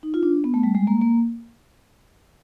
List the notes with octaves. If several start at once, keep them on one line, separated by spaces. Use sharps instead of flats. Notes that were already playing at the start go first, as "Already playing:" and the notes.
D#4
F4
D4
B3
A3
G3
G#3
A#3
A#3